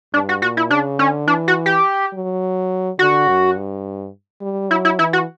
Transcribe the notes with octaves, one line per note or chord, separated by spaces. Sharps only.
G2 D4
F#4
A#2 F#4
E4
C#3 D4
D3 C#4
E3 D4
F#4
G4
F#3
D3 F#4
F#2
G2
G3
F#3 E4
E4
E3 E4
F#4